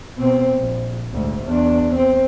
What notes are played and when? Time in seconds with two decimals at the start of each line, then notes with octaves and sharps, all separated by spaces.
0.17 B2 C4
0.54 A#1
1.10 D2 G#2
1.45 E2 D4
1.94 C4